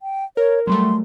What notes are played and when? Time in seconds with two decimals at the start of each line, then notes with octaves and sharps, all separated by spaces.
0.02 G5
0.37 A#4 C#5
0.67 F#3 G3 A3 C6